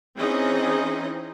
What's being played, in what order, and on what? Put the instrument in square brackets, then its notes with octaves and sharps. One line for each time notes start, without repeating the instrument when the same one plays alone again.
[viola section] E3 C4 C#4 D#4 G#4 D#5